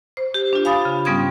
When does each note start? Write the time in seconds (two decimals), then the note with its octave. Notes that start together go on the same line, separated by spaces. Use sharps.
0.17 C5
0.34 G4
0.53 D4 F4
0.65 F5 G#5 B5 D#6 A6
0.85 C#3
1.05 G#2 G3 B3 C#4 D#6 G#6